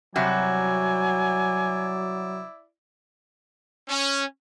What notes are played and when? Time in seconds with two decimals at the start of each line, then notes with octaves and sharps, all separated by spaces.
0.16 C3 F#3 G3 E4 F#4 D5 G#5
3.89 C#4